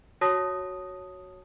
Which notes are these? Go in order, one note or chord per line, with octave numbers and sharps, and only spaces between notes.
F#4 C#5 A5 D#6 A#6